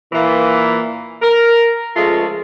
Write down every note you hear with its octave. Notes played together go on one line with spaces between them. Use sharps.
A#2 E3
A#4
C#3 F3 G#3 A3 F4